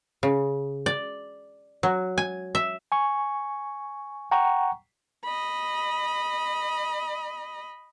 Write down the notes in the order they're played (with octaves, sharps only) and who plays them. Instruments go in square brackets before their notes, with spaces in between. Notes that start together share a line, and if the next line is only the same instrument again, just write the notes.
[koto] C#3
D5
F#3
G#5
E5
[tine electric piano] G#5 C#6
F#5 G5 A#5 C#6
[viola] D#5 B5